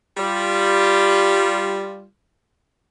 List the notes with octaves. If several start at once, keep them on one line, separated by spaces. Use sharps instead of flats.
G3 F4